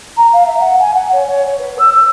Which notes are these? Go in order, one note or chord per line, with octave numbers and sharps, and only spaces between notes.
A#5
F5
E5
F#5
G#5
F#5
C#5
C#5
C#5
B4
E6
E6